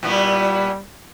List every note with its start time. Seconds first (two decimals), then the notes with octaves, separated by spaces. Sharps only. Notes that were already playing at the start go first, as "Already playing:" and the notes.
0.03 A#2 G3 B3 E4